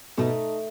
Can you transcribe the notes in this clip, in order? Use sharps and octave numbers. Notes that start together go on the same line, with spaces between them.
B2 A3 D#4 A4